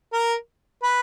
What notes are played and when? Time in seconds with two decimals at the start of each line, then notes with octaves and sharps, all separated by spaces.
0.13 A#4
0.83 B4